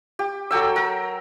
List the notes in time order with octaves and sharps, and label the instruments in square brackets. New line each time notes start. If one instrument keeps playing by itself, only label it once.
[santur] G4
F#3 A4 G5 E6
A#4